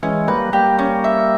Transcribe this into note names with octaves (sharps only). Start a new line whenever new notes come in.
E3 G#3 C#4
G3 A#3 B4
G3 A#3 G4
C#4
E5